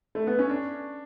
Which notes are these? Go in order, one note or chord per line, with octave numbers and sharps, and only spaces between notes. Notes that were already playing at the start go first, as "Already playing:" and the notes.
A3
B3
C#4
D4